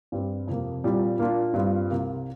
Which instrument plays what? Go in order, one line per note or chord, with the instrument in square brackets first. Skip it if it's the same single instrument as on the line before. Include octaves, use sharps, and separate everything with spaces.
[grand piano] G2 G3 C4
F2 C3 A#3
A#2 G3 C4 F4
A#2 A#3 D4 F4
G2 G3 C4 F4
C2 C3 A#3